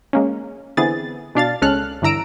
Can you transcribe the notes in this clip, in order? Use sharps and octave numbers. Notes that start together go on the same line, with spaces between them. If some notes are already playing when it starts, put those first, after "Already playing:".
G#3 A#3 C#4
D3 E3 B3 C4 G#4 A6
B2 D4 F5 A6
C#2 G#3 C#4 A4 F6 F#6
G2 D3 E3 A#5 E6 D7